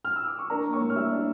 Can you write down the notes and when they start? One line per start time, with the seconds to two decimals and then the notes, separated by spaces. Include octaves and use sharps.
0.05 F6
0.16 E6
0.27 D6
0.39 C#6
0.50 D4 A#4 A#5
0.65 A#3
0.73 C#5 C#6
0.81 A2
0.90 F6
0.96 G3 E5 E6
1.12 D4